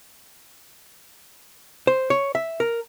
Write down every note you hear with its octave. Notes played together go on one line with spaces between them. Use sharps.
C5
C#5
E5
A#4